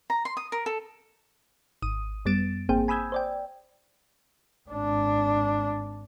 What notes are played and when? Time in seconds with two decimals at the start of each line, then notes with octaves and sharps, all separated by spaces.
0.10 A#5
0.25 C6
0.37 D#6
0.52 A#4
0.66 A4
1.82 G#1 D#6 D#7
2.25 F#2 G3 B3 A6 D7 E7
2.69 G#1 A#3 C4 G#4 C5 G5
2.88 G#5 B5 D#6 E6 G6 G#6
3.12 C5 D5 G5
4.69 G#1 D4